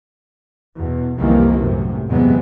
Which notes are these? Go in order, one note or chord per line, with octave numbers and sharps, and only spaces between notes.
E2 B2
C2 F2 C3 D#3 E3 A#3
F#2 A2 C3
E2 G#2 C3 F#3 G#3 B3